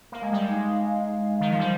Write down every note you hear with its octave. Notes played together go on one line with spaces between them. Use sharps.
A#3 F5
G#3
G3
G#3
D#4
F5
D#4
D#3
F3
G3 C5